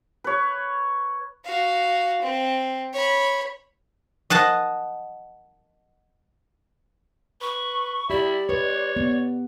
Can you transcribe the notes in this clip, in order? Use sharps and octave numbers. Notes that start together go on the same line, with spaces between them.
B4 C#5
F#4 F5
C4
C#5 B5
D#5 F#5 A5
B4 C#6
E4 G4 D5
B4 C#5
B3